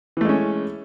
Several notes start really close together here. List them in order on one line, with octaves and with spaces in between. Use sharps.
E3 A3 G#3 C#4